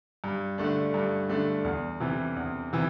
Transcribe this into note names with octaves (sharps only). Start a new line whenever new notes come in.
G2
D3 A3 D4
G2
D3 A3 D4
E2
C3 E3
E2
C3 E3